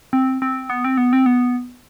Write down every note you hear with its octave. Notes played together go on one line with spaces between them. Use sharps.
C4
C4
B3
C4
B3
C4
B3